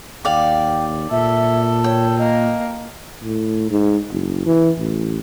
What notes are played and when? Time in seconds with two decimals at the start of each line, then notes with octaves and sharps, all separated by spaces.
0.25 D#2 D5 F5 G5
1.11 A#2 A4 E5
1.84 C#5 G5
2.19 A#3 D#5
3.23 A2
3.71 G#2
4.11 F#1
4.46 E3
4.79 A1